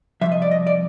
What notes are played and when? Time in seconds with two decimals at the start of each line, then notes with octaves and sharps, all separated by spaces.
0.21 C2 A#2 F3 E5
0.32 D#5
0.42 D5
0.51 D#5
0.67 D5